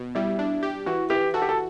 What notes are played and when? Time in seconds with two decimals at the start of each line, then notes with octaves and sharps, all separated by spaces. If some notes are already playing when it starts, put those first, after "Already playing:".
Already playing: B2
0.15 G3 E4
0.39 D4
0.63 G4
0.86 E3 F#4
1.10 E3 G4
1.34 F#4 A4
1.42 G4
1.49 A4